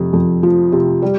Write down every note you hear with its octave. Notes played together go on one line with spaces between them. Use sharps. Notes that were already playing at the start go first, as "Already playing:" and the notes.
Already playing: F2 C3
F2
F3
C3
G3